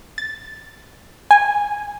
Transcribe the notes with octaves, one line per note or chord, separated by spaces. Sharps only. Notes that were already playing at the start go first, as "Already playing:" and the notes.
A6
G#5